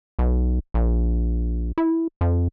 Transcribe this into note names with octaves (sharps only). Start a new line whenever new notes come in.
B1
A#1
E4
F2